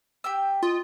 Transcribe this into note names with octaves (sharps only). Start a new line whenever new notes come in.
G4 G5 E6
F4 D#5